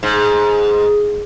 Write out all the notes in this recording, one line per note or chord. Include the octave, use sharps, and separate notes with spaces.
G#2